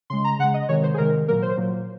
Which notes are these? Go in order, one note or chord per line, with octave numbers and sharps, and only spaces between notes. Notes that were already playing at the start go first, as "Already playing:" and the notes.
C#3 G#3 C6
A#5
C#3 G#3 F#5
D#5
C3 D#3 G#3 C#5
C5
G#4
C3 D#3 G#3 A#4
A#2 F#3 A#3 A#4
C5
A#2 F#3 A#3